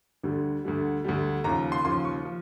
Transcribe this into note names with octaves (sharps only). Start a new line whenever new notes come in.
D2 D3 G3
D2 D3 G3
D2 D3 G3
D#2 C#3 F3 A#5
C6
D#2 C#3 F3 C6
C#6
F3